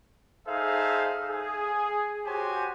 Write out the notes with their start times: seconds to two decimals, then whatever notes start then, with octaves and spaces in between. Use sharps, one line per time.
0.48 D#4 G#4 A4 C5 E5 F5
1.30 G#4
2.26 F#4 G4 C5 C#5 G#5